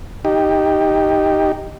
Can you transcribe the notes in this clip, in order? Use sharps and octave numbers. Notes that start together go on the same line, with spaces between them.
D#4 G4